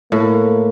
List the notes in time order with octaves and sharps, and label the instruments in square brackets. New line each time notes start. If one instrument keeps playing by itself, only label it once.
[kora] A2 [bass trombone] A#3